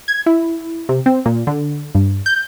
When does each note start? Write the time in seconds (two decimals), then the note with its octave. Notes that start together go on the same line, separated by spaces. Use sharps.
0.08 G#6
0.26 E4
0.89 C3
1.06 C4
1.25 A#2
1.47 D3
1.95 G2
2.26 G6